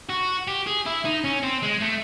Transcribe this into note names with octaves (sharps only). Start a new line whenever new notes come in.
F#4
G4
G#4
E4
D#4
C#4
C4
G#3
A3